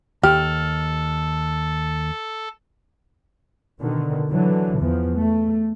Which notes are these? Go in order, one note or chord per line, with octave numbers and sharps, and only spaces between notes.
D#2 G4 A4 F6
B2 D3 D#3
D3 E3 F#3
E2 F3
A3